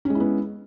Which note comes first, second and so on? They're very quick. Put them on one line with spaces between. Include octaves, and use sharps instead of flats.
C#4 G#3 E4 B3